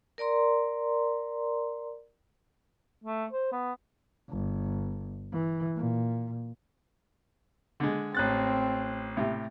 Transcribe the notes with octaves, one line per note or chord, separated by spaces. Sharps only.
A#4 D5 A#5 C6
A3
C5
B3
G1
E3
A#2
D3 G#3
A1 C4 F#6 A6
A2 C3